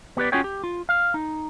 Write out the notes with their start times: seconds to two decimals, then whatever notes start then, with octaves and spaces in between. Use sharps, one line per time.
0.17 B3 G4 B4 D5
0.32 C#4 F4 F#4 G#4 C#5 G5
0.44 G4
0.64 F4
0.89 F5
1.14 D#4